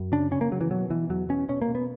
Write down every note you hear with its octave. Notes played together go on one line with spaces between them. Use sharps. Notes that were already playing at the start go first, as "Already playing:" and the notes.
Already playing: F#2
C#3 D4
C#3 C#4
A#3
C#3 F#3
E3
B2 F#3
B2 E3
E2 F#3
B2 C#4
B2 C#4
A#3
B2
B3